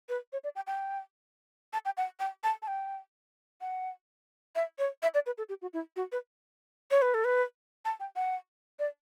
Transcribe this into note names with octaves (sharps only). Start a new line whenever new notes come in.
B4
C#5
D5
G5
G5
A5
G5
F#5
G5
A5
A5
G5
F#5
E5
C#5
E5
D5
B4
A4
G4
F#4
E4
F#4
B4
C#5
B4
A4
B4
A5
G5
F#5
D5